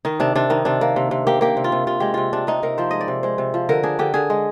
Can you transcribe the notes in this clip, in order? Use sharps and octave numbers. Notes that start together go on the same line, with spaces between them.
D#3 D#4
C3 D4
C3 D4
D#3 D#4
C3 D4
A#3
C3
C3
A#3 G4
A#3 G4
C3
F4
C3
C3 F4
G#3 G4
C3 F4
C3 D4
C3 D#4
C3 A#4
F3 C5
G#3 D#5
D5
C3
G#3 C5
C3
F3
D3 A#4
D4 G#4
D3 G4
D3 G#4
G#3